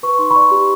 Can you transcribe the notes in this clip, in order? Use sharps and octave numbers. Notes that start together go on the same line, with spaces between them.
B4 C#6
D#4 C6
B5 C#6
D5
G4